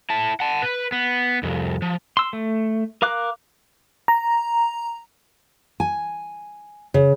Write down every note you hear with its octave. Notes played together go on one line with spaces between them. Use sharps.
E4 A5
F#5 A5
B4
B3
C2 F2
F3
C6 E6
A3
A#4 F5 D6 F#6
A#5
G#5
C#3